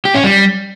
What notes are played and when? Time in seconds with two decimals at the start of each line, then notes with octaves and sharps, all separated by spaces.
0.05 G4
0.14 C#4
0.24 G3